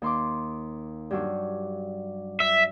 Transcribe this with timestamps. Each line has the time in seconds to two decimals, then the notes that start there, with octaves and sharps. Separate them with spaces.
0.02 D#2 C6 D6
1.11 G2 F#3 D4
2.40 E5